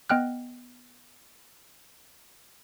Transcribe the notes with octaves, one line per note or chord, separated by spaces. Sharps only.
B3 D#5 G5 F6 F#6